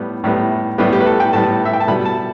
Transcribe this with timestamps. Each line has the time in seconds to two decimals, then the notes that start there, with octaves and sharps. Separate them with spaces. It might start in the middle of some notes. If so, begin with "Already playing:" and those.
Already playing: A2 G3 B3
0.24 A2 G3 B3
0.78 A2 G3 B3 G4
0.93 G4
1.01 B4
1.06 A4
1.20 G5
1.33 A2 G3 B3 A5
1.65 E5
1.73 G5
1.80 A5
1.88 B2 G3 B3 B5
2.05 A5